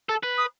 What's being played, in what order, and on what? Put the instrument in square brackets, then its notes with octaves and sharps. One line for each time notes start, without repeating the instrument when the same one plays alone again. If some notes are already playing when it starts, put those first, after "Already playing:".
[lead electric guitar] A4
B4
[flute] D#6